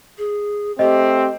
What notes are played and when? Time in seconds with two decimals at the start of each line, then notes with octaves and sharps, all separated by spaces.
0.18 G#4
0.79 A3 C4 G4 D#5